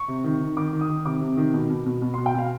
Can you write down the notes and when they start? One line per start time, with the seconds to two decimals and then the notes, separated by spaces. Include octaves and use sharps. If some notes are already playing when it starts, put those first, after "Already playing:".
Already playing: C#6
0.08 C3
0.24 D#3
0.41 D#3
0.57 D#3 D6
0.73 D#3
0.81 D#6
0.89 D#3
1.05 C3 D6
1.21 C3
1.37 D#3
1.54 B2
1.70 B2
1.86 B2
2.02 B2
2.14 C6
2.18 B2
2.26 G5
2.34 B2 F5